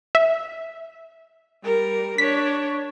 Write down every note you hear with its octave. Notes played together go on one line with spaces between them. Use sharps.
E5
G3 A#4
D4 C#5 B6